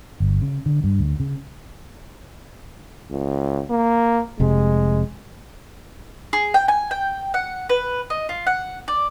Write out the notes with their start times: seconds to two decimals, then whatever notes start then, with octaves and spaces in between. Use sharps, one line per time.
0.20 G1
0.42 C#3
0.66 D3
0.84 G2
0.99 D2
1.20 C#3
3.10 C#2
3.70 A#3
4.40 F1 C3 G#3
6.33 G#4
6.54 G5
6.68 G#5
6.91 G5
7.34 F#5
7.69 B4
8.10 D#5
8.29 F4
8.47 F#5
8.88 D5